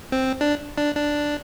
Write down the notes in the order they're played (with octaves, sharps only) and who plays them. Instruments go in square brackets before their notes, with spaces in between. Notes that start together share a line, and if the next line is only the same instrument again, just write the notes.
[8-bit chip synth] C4
D4
D4
D4